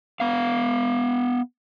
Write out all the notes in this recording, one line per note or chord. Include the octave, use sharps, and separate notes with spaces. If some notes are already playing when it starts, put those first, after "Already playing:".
B3 F5